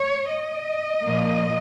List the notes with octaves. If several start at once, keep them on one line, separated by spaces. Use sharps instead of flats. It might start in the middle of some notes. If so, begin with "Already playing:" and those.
Already playing: C#5
D#5
A#2 F3 A#3